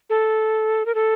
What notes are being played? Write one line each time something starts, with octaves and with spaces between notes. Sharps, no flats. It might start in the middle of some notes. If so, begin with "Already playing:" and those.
A4
A#4
A4